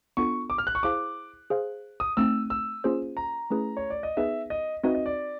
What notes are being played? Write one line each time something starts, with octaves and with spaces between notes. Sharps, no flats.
B3 D4 F4 A4 C#6
D6
F6
F#6
C#6
E4 G#4 C5 F5 A5 D6
G#4 C5 F5
D#6
A3 C4 D#4 E6
E6
A#3 C#4 F4 G#4 C5
A#5
A3 C#4 E4 G#4 B4
C#5
D5
D#5
B3 D#4 G#4 B4 E5
D#5
C4 D#4 F#4 B4 D#5 E5
D#5
D5